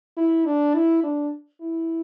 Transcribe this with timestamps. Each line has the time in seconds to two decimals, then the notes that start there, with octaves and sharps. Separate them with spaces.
0.17 E4
0.46 D4
0.75 E4
1.03 D4
1.62 E4